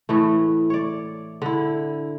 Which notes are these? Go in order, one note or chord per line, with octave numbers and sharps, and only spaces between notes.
A2 E3 A3
C#5 D5
D3 E4